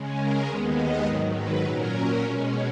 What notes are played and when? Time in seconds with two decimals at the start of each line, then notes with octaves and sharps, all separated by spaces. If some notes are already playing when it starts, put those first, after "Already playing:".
Already playing: C#3 G#3 C#4
0.18 A#4
0.46 D#2 D#3 G#3 B3 C#5
0.76 D#5
1.05 G#2 D#3 F#3
1.34 B4
1.64 A#2 F#3 C#4 A#4
2.22 B2 G#3 C#4